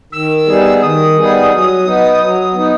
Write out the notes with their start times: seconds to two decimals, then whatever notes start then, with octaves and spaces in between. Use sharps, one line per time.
0.12 D#3 E6
0.47 G3 B3 D#4 G#4
0.81 D#3 D#6
1.16 G3 B3 D#4 G#4
1.51 F#3
1.85 B3 D#4
2.19 F#3
2.54 B3 D#4